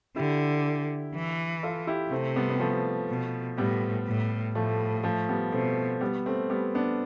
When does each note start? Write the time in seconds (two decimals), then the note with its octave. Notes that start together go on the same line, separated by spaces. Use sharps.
0.16 D3 E4 G4
1.15 E3
1.63 F4 A4
1.87 E4 G4
2.11 C3 A3 C4
2.36 G3 B3
2.50 B3
2.60 F3 A3
3.09 B2
3.58 A2 G3 B3
4.07 A2
4.55 A2 F3 A3
5.04 F3 A3
5.29 G3 B3
5.52 B2 A3 C4
6.01 G3 B3
6.26 A3 C4
6.50 G3 B3
6.75 B3 D4